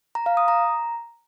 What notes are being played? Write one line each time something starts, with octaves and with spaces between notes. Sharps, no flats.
A#5
F5
D#6
A#5